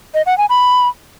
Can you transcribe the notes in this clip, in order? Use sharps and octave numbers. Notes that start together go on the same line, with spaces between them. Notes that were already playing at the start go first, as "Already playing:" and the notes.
D#5
F#5
G#5
B5